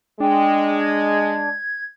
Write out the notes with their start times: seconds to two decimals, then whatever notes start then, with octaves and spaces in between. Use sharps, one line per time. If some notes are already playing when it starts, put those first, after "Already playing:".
0.20 G#3 D4 G5
0.80 G#6